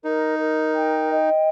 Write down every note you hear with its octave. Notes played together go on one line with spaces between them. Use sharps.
D#4 A#4
A#4
G5
D#5